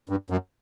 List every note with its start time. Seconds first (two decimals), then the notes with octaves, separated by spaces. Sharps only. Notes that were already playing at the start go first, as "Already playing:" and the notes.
0.09 G2
0.30 F#2